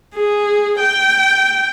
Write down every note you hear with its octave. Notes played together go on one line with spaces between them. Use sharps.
G#4
G5